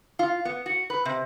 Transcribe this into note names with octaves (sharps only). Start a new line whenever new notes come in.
F4
B3
F#4
B4
C3